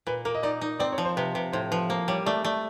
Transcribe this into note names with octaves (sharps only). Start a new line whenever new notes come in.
A#2 B4
A#3 A#4
D#5
D#4 D5
D#4
C4 D5
C#5
F3
C5
C3 B4
C3 B4
A2 C5
F3 B4
A#3 C5
G3 C#5
A3 D5
A3 D5